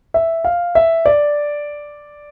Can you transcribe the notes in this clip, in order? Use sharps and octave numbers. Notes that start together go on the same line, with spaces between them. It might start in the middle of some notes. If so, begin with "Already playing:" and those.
E5
F5
E5
D5